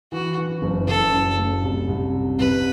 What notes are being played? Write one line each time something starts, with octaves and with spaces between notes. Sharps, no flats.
E3 F#4
E3
F#1
F#1 A4
F#2
A3
C2
C2
C3
C2 B4